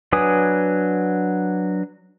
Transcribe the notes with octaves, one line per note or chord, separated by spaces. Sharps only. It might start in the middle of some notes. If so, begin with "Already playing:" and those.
F#3 D4 B4 G#5 D#6